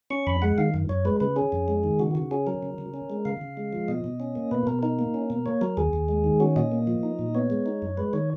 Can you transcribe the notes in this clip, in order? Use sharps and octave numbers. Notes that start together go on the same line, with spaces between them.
C#4 C#6
F2 B5
G#3 F#5
D#3 F5
F#2
F#2 C#5
G#3 B4
C#3 B4
C#4 G#4
F2
G#3
D#3
C#3 F#4
C#3 F#4
C#4 G#4
F#3 A#4
C#3
C#3
C#4
G#3
C#3 F5
C#3
G#3
F3
B2 D#5
B2
C#4
A#3
B2 B4
B2 A#4
D#4 A#4
A#3
C#4
B2
A#3 C#5
F#3 A#4
D#2 G#4
D#2
G#3
D#3
C#4 F#4
A#2 D#5
A#3
F3
D#4
A#2
B3 C#5
G#3
D#4
F#2
G#3 B4
D#3 C#5